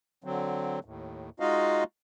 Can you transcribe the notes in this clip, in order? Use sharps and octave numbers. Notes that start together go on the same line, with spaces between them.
D3 F#3 C4
D#2 A2
G#3 D#4 F4 F#4 D#5 F5